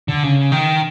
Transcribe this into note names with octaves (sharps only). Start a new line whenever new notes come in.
D3
C#3
D#3